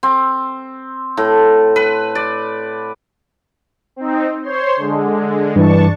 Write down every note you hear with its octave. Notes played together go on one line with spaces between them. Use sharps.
C4
A2
B4
D5
C4 D#4
C5 C#5 C6
D3 G#3
G2 E3 D4 A5 C#6